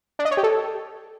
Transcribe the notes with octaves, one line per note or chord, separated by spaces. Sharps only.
D4
D#5
C#5
G4
A4